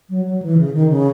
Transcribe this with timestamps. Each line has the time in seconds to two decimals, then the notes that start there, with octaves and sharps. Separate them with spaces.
0.10 F#3
0.25 F#3
0.42 E3
0.58 C#3
0.74 D#3
0.90 C#3